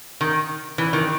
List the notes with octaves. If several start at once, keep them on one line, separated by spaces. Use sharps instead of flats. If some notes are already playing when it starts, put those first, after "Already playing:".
D#3
E3
D#3